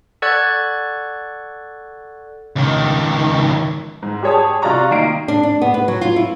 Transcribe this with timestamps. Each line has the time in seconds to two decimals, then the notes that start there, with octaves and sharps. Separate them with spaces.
0.22 A4 D5 F#5 C#6 F#6 G#6
2.56 C#2 D#3
4.03 G#2
4.23 G4 G#4 C#5 A5 D#6
4.62 C3 F4 F#4 D5 A#5 C#6
4.91 D#3 A#3 F4 D#5 C7 D7
5.28 D4
5.43 D4
5.62 B3
5.74 B4
5.88 F#3
6.01 F4
6.16 E4